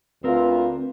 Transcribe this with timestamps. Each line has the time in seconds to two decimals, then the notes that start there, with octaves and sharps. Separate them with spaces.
0.24 D2 C4 F4 A#4 B4